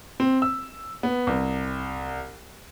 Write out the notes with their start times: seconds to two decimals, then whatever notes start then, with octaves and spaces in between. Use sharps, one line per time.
0.20 C4
0.42 E6
1.03 B3
1.27 C2